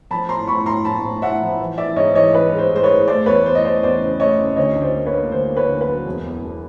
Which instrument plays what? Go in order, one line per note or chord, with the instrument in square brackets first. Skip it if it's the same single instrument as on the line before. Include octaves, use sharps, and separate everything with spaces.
[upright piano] F3 A5 B5
A2 A#5 C6
A2 B5 C#6
A2 A#5 C6
A#1 A5 B5
A2
A2 E5 F#5
F3
E3
E3 D5 E5
G#2 C#5 D#5
E3 C#5 D#5
E3 B4
G#3
C5
G#3 C5
B4 C#5
G#3
A3 C5 D5
E2 B4 C#5
E2 C5
D#5
A3 C5 D5
E2 C5 D5
C#3
A3 C#5 D#5
C#3
D2 C#5 D#5
D2
C5 D5
A#3
B4 C#5
A#3
D2 C5
A#3
B4 C#5
D2
B4
F#3
E1
E2
E1